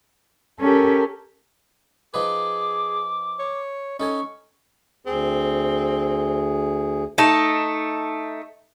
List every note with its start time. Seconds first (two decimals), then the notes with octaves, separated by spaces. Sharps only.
0.60 C#4 G4 A4 A#4
2.14 F3 D#4 G#4 B4 D6
3.39 C#5
4.00 C#4 D#4 A4 G#5 C#6
5.07 D2 C4 G#4
7.18 A3 D#4 A5